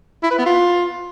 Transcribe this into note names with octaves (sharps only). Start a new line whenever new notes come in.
E4
B4
B3
F4